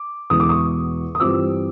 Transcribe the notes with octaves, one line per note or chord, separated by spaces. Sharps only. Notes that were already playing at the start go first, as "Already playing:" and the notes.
Already playing: D6
E2 B2 G#3 D#6
D6
C#6 D#6
D#6
G2 E3 G3 C4 F4 D6 E6